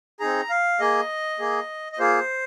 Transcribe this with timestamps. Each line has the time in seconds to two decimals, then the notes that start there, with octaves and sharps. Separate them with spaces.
0.20 C4 D#4 G#4 A#5
0.50 F5
0.80 A#3 G#4 D#5
1.39 A#3 G#4
1.92 D#5
1.99 A#3 F4 G#4 C5